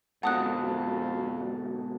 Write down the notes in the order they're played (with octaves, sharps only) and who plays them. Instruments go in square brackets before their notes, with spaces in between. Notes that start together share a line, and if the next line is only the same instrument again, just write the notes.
[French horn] F2 [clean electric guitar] G#2 B2 D3 [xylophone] F#5 D#6 F#6 [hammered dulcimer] A5